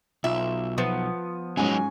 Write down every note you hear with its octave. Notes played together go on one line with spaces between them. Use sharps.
B1 F4 E5
F3 B3
G#2 F#3 C#4 D#4 G#5